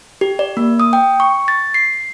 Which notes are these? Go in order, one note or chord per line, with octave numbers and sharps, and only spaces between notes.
G4
D5
A#3
D#6
G5
C#6
A6
C7